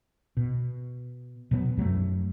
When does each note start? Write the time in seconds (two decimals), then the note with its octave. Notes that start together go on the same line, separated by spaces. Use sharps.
0.37 B2
1.51 B2 F#3 A#3 B3
1.77 F#2 F#3 G3 A3